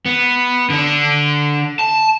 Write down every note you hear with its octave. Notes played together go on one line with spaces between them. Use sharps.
B3
D3 D4
A5